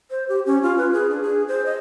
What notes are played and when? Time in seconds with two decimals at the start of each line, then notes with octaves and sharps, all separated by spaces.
0.11 C5
0.29 G4
0.46 C#4
0.63 F4
0.78 B4
0.93 G#4
1.10 D4
1.22 G#4
1.48 C5
1.66 D#5